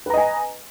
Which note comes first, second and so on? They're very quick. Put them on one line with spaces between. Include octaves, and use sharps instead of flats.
B4 A#5 D#5 G#5